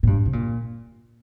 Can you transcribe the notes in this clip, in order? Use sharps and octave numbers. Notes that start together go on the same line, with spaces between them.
A#2
G2
C3
A#2